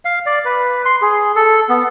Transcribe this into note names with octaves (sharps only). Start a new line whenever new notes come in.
F5
D5
B4
C6
G#4
A4
B3